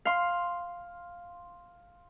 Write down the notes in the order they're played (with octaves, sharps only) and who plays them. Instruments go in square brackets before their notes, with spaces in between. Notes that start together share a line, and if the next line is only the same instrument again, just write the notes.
[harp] F5 C6